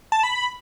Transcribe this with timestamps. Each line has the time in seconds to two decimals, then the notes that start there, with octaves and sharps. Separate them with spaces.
0.12 A5
0.23 B5